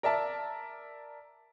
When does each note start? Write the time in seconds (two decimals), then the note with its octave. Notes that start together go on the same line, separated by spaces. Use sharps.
0.03 A#4 D5 E5 A5